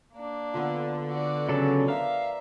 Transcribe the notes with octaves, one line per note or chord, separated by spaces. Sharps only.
A#3 D4
D3 F3 B3
F#4 D5
C#3 F#3 A4
A#4 D5 E5 F5